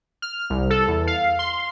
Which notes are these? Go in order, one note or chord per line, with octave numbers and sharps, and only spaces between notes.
F6
C2
A4
E2
F5
C6